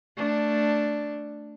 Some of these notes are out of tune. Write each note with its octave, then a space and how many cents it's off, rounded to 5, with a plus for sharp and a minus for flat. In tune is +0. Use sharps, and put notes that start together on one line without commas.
A3 +5 D4 +0